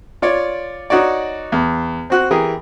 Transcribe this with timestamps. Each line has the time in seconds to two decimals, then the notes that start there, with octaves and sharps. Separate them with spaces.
0.22 F4 C#5 D5
0.90 D#4 F#4 C#5 D5
1.52 E2
2.10 C4 F#4 F#6
2.31 E3 G4 G#4 A#4